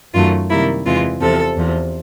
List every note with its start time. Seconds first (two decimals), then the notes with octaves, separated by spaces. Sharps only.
0.14 F#2 D#3 F#3 A3 F4
0.50 C3 D#3 G3 A#3 E4
0.85 E2 C3 E3 G#3 F4
1.21 E2 C3 F3 A4
1.57 E2 C3 F3